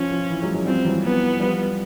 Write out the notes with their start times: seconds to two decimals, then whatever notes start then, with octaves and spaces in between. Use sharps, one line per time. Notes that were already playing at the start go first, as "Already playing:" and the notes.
Already playing: F3 C#4
0.11 F3
0.29 E3
0.42 F#3 G#3
0.54 F#3 G#3
0.66 F3 G3 C4
0.85 E3 F#3
1.03 B3
1.40 F3 G3